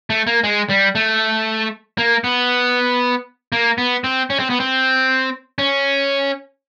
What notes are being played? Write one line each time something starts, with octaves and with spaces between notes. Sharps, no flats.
A3
A#3
G#3
G3
A3
A#3
B3
A#3
B3
C4
C#4
C4
B3
C4
C#4